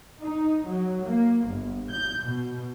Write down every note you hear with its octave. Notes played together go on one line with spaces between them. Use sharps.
D#4
F#3
A#3
G1
G6
B2